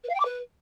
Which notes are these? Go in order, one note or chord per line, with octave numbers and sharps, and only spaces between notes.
B4
F5
G5
D6
B4